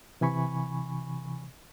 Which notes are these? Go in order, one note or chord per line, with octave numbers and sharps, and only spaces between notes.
C3 E3 G#5 B5 C#6